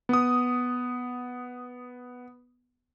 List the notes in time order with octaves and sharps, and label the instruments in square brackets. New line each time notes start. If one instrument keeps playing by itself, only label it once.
[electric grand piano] B3 D#6